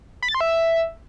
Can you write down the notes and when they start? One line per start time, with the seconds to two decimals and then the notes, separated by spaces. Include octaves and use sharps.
0.23 B5
0.29 A6
0.35 C6
0.41 E5